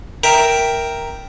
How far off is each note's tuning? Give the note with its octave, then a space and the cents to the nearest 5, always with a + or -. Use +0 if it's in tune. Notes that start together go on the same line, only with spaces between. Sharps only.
A#4 +0 E5 +0 G5 +0